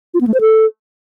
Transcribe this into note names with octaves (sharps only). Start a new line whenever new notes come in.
F4
B3
A3
C5
A4